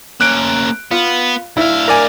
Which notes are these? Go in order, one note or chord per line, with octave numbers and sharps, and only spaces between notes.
A#3 C#4 F#6 D7
B3 F4
D2 E4 F5
A#4 D5 G#5